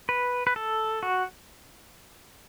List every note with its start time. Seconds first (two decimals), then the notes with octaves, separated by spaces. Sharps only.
0.09 B4
0.47 B4
0.56 A4
1.03 F#4